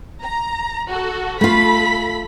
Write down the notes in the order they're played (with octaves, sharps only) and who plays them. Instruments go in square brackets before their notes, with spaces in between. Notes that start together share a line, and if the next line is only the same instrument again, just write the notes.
[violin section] A#5
F#4 A4
[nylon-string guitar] A3 F4 [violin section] A4 B5 B6